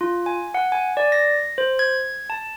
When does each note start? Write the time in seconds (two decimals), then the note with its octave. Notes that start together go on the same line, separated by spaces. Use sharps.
0.01 F4
0.26 G#5
0.54 F#5
0.72 G#5
0.97 D5
1.12 A#6
1.58 C5
1.79 G#6
2.30 A5